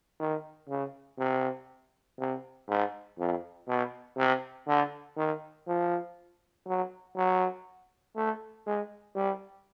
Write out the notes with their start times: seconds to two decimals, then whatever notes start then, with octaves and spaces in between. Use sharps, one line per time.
0.20 D#3
0.69 C#3
1.19 C3
2.19 C3
2.68 G#2
3.19 F2
3.68 B2
4.17 C3
4.67 D3
5.17 D#3
5.67 F3
6.67 F#3
7.16 F#3
8.16 A3
8.66 G#3
9.16 G3